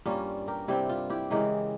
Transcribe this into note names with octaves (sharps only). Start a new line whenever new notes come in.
G2 G3 A#3 C#4 F4
G4 A#4
C3 G3 C4 E4 G4
F4
E4 G4
C#3 E3 G#3 G4 A#4